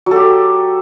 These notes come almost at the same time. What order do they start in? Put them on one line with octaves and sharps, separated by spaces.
F#3 A4 G4